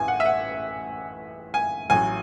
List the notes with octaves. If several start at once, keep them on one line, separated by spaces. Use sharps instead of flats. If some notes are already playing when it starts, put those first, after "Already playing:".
Already playing: A1 A2 E3 G#5
F#5
E5
F#5
G#5
A1 A2 F#3 G#5